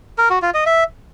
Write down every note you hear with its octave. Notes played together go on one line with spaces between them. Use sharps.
A#4
F#4
F4
D#5
E5